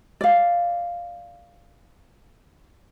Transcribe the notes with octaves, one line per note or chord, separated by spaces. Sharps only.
D5 F5